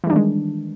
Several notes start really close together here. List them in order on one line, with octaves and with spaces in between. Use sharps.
E3 G3 D4 D#3 G#3